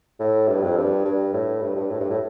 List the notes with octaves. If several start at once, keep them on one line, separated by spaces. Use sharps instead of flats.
A2
G2
F2
G2
G2
A2
G2
G2
A2
G2
A2